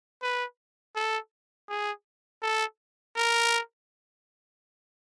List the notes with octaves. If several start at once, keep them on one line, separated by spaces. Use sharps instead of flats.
B4
A4
G#4
A4
A#4